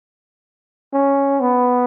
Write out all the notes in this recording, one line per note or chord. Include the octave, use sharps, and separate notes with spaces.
C#4
B3